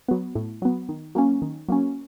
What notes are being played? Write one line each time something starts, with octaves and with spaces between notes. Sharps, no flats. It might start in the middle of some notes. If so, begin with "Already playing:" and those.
F#3 B3
A2
F#3 B3
D#3
F#3 A#3 C#4
D#3
F#3 A#3 C#4